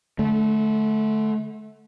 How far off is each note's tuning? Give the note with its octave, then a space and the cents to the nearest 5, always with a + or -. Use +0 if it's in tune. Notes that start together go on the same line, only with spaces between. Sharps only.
D3 +0 A3 -30